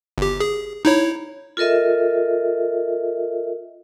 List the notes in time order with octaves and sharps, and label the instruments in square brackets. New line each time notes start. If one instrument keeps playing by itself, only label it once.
[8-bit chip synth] G1 G4
G#4
D#4 E4 C#5
[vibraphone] F4 A4 A#4 D#5 E5